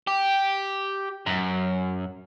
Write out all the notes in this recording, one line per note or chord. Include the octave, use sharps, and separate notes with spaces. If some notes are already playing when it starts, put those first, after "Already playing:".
G4
F#2